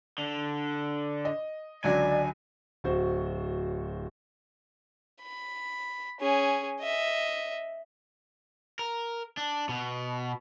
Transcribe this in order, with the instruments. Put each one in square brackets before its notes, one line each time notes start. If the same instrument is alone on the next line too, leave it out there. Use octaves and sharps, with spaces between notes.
[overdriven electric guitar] D3
[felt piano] D#5
[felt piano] C#2 D3 F#3 [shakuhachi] D5 [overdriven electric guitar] G#5
[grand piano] D1 F#4 C5
[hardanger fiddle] B5
C#4 G#4
D#5 E5
[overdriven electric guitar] A#4
D4
B2